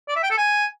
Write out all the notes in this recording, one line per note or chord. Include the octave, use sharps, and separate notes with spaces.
D5
E5
G5
A4
G#5